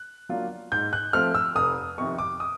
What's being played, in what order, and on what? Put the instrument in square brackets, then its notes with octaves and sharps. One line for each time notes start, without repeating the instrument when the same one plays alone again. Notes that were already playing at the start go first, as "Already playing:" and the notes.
Already playing: [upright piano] F#6
F#3 A#3 D4 F4
G#2 G6
F#6
F3 A3 C4 F6
E6
F1 D#6
F2 C3 D#3 C#6
D6
D#6